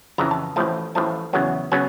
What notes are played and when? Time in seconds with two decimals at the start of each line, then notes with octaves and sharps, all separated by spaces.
0.18 F2 C#3 E3 A#5
0.31 A5
0.56 A1 A2 F3 A3 A5
0.95 A1 A2 F3 A3 A5
1.33 E2 C#3 F#3 B3
1.72 C#3 F#3 B3 G#5